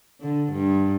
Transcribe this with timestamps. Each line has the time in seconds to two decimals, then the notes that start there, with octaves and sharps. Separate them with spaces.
0.21 D3
0.53 G2